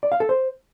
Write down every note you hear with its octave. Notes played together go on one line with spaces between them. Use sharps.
D5
F5
A4
C5